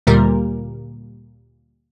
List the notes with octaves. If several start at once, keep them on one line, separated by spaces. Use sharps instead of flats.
D2 A#2 G3 A#4